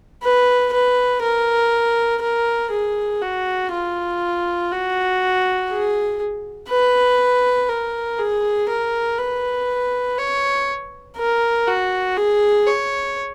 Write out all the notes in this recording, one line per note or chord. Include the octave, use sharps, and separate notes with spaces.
B4
B4
A#4
A#4
G#4
F#4
F4
F#4
G#4
B4
A#4
G#4
A#4
B4
C#5
A#4
F#4
G#4
C#5